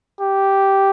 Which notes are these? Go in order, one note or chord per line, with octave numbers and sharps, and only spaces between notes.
G4